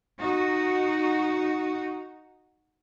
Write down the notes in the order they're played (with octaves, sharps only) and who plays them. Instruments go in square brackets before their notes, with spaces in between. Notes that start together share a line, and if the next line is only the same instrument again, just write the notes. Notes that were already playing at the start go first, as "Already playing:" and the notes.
[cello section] D#4 F#4